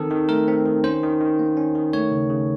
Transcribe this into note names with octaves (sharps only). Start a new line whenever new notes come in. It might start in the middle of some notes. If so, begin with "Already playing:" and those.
Already playing: D#3 C4 A4
D#3
A3 A#4
C4
D#3
C#4 C5
D#3
D#3
A#3
C#4
D#3
A3 C#5
C#3
C#3